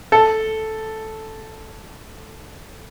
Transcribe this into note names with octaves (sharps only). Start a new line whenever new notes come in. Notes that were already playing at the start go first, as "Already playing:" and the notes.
A4